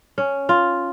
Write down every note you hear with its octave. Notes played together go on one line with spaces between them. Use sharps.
C#4
F4